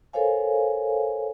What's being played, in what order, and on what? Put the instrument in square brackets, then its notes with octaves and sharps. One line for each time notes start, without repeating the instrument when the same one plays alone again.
[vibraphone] A4 A#4 C5 C#5 F5 G#5